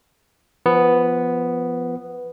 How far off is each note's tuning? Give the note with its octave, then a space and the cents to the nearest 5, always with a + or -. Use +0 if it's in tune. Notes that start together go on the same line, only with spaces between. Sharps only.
F3 -15 B3 +0